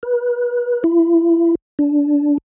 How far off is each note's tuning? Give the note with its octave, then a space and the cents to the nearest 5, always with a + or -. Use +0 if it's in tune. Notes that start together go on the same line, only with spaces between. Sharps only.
B4 -30
E4 +30
D4 -15